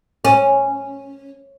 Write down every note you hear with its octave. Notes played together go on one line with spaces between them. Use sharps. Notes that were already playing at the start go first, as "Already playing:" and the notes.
C#4